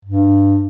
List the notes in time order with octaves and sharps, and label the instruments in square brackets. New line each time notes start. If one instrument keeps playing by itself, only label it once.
[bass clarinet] G2